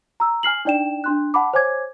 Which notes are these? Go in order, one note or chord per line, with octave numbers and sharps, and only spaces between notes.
A#5 E6
G#5 F6 C7 F#7
D4 D#4 D5 G5 E7
D4 C6 F#6
F#5 A5 B5 D6
C5 C#5 G#5 D6 G#6